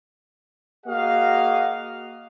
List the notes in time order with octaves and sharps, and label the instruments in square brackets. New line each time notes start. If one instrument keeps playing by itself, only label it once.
[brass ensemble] A#3 F#4 G#4 D#5 F5